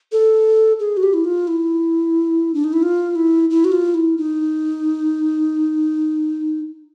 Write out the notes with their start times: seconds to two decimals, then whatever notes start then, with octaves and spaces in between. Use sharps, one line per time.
0.12 A4
0.80 G#4
0.97 F#4
1.03 G4
1.14 E4
1.25 F4
1.48 E4
2.54 D4
2.64 D#4
2.73 E4
2.83 F4
3.16 E4
3.50 E4
3.65 F#4
3.72 F4
3.94 E4
4.17 D#4